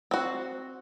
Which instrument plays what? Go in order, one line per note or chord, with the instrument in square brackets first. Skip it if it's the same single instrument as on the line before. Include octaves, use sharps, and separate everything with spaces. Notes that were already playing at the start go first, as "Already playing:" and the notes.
[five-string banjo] C4 F#4